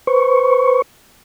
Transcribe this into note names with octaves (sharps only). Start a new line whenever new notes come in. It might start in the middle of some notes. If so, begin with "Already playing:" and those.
B4 C5 C#6